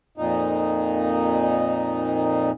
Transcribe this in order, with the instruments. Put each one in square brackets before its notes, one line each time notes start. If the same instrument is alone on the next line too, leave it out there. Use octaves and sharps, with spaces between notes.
[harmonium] F2 A#2 D#4